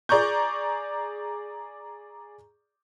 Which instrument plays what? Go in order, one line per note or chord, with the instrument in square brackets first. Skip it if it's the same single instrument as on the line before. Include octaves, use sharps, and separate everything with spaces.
[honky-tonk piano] G#4 D5 A#5 C#6 G6